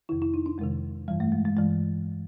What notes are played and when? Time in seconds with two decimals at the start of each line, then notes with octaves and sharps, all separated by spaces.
0.09 F2 C3 D#3 E4
0.22 E4
0.34 D#4
0.46 D4
0.59 F2 C3 D#3 G#3
1.08 G2 E3 G3
1.20 A3
1.32 G#3
1.45 G#3
1.57 G2 E3 G#3